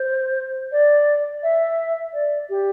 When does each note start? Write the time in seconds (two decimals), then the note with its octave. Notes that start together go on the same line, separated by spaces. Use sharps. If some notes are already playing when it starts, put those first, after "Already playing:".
Already playing: C5
0.72 D5
1.43 E5
2.14 D5
2.50 G4